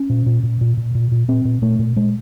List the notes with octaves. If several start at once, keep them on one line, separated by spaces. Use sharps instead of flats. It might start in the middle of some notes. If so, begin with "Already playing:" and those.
Already playing: C#4
A#2
A#2
A#2
A#2
A#2
A#2
A#2
A#2 C4
A#2
A#2 A3
A#2
A#2 G#3